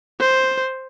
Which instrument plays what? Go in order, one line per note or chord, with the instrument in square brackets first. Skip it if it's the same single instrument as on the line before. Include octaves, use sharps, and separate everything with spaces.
[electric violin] C5